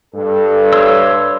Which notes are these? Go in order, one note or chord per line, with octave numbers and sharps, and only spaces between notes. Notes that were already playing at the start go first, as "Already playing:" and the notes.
G2 A4
C#5 C6 E6